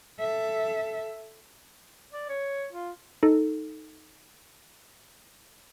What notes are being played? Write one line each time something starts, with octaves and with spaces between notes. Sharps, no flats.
A4 E5
D5
C#5
F4
D#4 A4